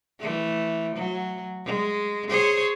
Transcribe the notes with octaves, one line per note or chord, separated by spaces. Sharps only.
E3 A3
F#3
G#3
G#4 C5 C#5